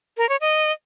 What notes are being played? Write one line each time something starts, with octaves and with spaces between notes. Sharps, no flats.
A#4
C#5
D#5